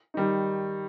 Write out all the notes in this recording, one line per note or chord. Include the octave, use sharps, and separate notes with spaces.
D#3 G3 D#4